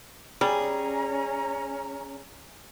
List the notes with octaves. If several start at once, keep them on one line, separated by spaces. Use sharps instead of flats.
G3 C#4 G#4 A#5